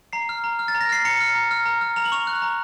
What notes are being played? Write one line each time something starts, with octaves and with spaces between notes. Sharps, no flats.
A#5 C7
F6
A#5
F6
A6
A#5
A#6
F6 C7
A#5 C#7
F6
A#5
F6
A#5
F6
A#5 F7
F#7
C#6 F7
F#6
A#5